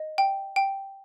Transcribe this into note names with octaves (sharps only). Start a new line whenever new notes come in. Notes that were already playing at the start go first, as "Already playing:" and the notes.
Already playing: D#5
G5
G5